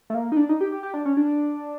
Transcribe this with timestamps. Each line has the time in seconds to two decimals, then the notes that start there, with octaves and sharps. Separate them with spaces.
0.10 A3
0.14 A#3
0.32 D#4
0.37 D4
0.49 D#4
0.61 G4
0.72 G4
0.83 G4
0.94 D4
1.05 C#4
1.17 D4